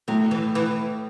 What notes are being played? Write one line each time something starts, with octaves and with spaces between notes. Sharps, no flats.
A2 F#3
E3
E3